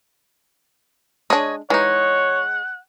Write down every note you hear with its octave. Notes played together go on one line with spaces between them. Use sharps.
G#3 D4 G#4 C#5 D#5
E3 G#3 D#4 C#5 F#5